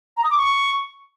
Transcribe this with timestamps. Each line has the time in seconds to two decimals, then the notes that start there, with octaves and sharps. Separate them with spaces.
0.17 A#5
0.24 D#6
0.31 D6
0.37 C#6